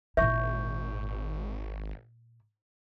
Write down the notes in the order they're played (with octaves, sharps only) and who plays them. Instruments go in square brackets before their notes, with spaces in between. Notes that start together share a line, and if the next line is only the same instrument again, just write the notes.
[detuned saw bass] G#1 [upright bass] A#2 E4 [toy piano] E5 [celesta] C#6 G6